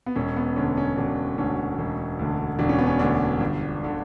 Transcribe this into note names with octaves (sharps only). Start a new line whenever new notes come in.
B3
E1 C#4
B3
D2 D3 C#4
C#4
E1 D4
D2 D3 C#4
E1
D2 D3
E1 D4
C#4
B3
C#4
D2 D3 D4
G1
D3